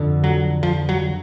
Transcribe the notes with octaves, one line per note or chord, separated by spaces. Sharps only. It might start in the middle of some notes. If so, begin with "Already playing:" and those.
Already playing: F2 D3
F#3
F3
F#3